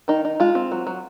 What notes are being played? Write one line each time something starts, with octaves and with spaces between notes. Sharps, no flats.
D#3 D#4
D#4
G#3 F4
C4
F#3
F#3